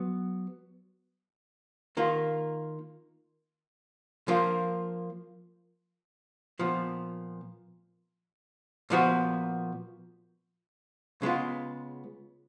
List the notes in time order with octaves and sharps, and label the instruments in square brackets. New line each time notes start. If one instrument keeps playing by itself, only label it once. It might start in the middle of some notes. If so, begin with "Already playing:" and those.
Already playing: [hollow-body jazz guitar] F#3 B3
D#3 A#3 F4
F3 A#3 F4
A#2 F3 B3
A#2 F3 B3 F#4
C#3 G#3 B3 F4